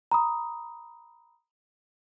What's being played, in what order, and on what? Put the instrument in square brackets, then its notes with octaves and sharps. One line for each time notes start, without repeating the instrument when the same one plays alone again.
[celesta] A#5 B5 D#6